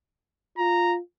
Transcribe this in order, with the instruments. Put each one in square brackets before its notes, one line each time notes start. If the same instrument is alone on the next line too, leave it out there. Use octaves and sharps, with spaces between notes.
[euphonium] F4 [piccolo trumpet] A#5